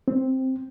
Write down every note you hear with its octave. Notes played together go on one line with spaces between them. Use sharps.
C4